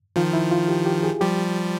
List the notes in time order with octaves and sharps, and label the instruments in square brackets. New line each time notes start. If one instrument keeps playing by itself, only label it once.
[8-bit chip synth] D#3 F3 [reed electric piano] F4
[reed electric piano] E4
F4
G4
G4
G#4
[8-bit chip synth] F3 G3 [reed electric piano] G4